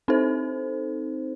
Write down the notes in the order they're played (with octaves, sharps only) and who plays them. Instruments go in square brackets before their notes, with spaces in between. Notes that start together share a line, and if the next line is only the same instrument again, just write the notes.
[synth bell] C4 D#4 A4 C5